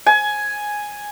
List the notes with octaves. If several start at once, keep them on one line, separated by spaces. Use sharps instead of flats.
G#5